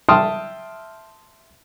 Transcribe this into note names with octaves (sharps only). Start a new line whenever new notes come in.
E5 G5 A5 C6 D#6 F6